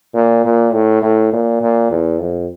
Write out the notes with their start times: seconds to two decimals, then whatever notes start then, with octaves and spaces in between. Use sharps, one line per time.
0.14 A#2
0.45 A#2
0.73 A2
1.02 A2
1.32 A#2
1.61 A#2
1.91 E2
2.20 F2